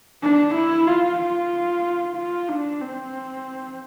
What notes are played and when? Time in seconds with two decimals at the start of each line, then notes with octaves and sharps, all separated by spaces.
0.23 D4
0.55 E4
0.87 F4
1.19 F4
2.16 F4
2.49 D4
2.81 C4